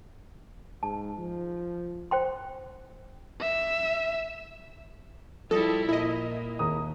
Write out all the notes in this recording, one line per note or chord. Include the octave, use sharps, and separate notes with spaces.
G#2 A5
F3
C5 G5 C6
E5
F3 G3 E4 A4 D#6 A#6
A#2 E4 D#5
D#2 A#5 D#6